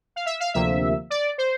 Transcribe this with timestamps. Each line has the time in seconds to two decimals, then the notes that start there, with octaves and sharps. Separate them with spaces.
0.16 F5
0.26 E5
0.40 F5
0.54 D2 C3 F3 A#3 E5
1.10 D5
1.38 C5